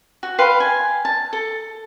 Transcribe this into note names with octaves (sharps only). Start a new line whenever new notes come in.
F#4
B4 F5 G5 C6
G#5
A5
A4